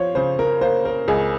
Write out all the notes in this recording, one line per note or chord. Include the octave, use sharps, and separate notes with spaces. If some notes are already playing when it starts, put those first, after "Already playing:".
Already playing: F3 C5 C#5
C#3 C5
A#4
A#3 C5
A#4
C#2 G#4